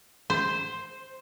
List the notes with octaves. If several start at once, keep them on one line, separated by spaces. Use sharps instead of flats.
C5